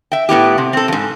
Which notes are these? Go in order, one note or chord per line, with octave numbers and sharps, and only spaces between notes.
E5 G5
A2 B3 E4 G4
C3
C4 A4
F2 G#2